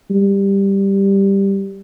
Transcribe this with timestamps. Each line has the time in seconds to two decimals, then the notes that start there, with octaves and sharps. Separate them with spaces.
0.11 G3